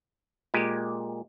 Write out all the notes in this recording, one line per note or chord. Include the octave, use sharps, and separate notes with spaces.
A#2 G#3 G4